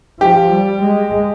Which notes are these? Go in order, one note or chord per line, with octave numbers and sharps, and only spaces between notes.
F3 G4
G3
G#3